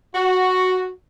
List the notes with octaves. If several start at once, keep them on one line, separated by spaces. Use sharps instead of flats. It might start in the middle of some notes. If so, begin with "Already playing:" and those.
F#4